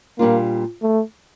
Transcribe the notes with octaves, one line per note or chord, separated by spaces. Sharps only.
A#2 G3 A#3 D4 F4
A3